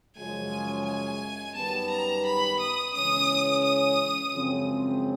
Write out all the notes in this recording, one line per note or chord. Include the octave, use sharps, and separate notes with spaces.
F#2 C#3 F3 G#3 G#5
G#5
F#2 D#3 G3 B3 A5
A#5
B5
D#6
C#3 E3 G#3 C#4 D#6
D#6
F#2 C#3 F3 G#3 C4